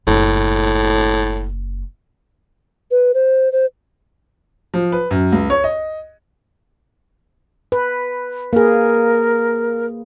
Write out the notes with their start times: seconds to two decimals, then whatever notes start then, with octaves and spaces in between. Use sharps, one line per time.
0.07 F#1 A2
2.91 B4
3.14 C5
3.52 C5
4.74 F3
4.92 B4
5.11 F#2
5.32 C#2
5.50 C#5
5.64 D#5
7.72 B4
8.53 A#3 G#4 A#4